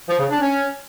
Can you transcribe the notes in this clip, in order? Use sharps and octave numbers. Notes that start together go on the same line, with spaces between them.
F3
C#3
D4
C#4